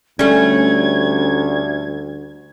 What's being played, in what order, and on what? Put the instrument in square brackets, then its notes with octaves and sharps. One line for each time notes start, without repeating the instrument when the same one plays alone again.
[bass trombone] D2 [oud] G3 A3 [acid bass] C#4 [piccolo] G#6